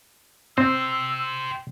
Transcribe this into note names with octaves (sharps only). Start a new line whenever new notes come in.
C4 G4 C5 E6